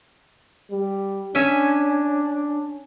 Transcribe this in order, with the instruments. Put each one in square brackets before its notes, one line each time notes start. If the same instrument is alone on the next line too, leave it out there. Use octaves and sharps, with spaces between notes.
[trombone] G3
[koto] C#4 E5 G#5 [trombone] D4